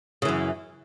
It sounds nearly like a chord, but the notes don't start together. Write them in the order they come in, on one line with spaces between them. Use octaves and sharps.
C#3 E3 F#2